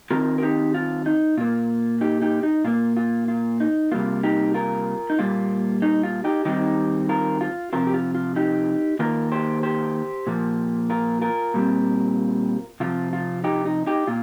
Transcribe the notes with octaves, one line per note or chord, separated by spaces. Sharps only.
D#3 C4 F4 A#4
A#4
D#4 G4
F4
D#4
A#2 A#3 F4
D#4 G4
D#4 G4
D#4
A#2 A#3 F4
F4
F4
D#4
C3 G3 A#3 F4
D#4 G4
F4 A#4
D#4
A#2 G3 A#3 F4
D#4
F4
D#4 G4
D#3 G3 C4 D#4 G4
F4 A#4
F4
C3 F3 C4 F4 A#4
G4
F4
F4
D#4 G4
D#3 A#3 F4 A#4
G4 C5
G4 C5
A#2 F3 A#3
F4 A#4
F4 A#4
A#2 G3 C4
C3 F3 C4 F4
F4
D#4 G4
D#4
D#4 G4
A#2 F4